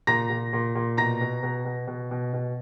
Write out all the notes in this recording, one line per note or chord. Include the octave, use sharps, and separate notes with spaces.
A#2 A#5 A#6
A#2
A#2
A#2
B2 A#5 A#6
B2
B2
B2
B2
B2
B2